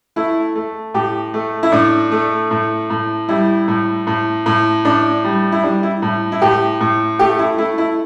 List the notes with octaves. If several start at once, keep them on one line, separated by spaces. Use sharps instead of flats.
A3 E4
A3
A2 G4
A3
E4
A2 D4
A3
A2
A2
G3 E4
A2
A2
A2
A2 D4
G3
E4
G3 D4
E4
A2
E4
A2 G4
A2
A3 G4
E4
A3 E4
E4